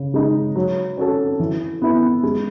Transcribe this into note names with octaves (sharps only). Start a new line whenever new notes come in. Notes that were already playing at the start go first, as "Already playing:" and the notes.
Already playing: C#3
G#3 D#4
F#3
C#4 F#4 A4
E3
B3 E4
G#3